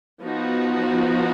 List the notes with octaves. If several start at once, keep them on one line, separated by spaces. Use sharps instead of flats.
F3 B3 D#4 F#4